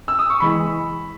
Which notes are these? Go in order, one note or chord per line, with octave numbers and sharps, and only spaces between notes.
E6
D#6
C#6
E3 G#3 B5